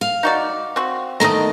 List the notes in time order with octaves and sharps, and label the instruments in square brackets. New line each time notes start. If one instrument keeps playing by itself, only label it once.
[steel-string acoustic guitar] F5
[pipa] D#4 F#4 D5
C4 F#4
[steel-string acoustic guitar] E2 D#3 A3 [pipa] D#5 A#5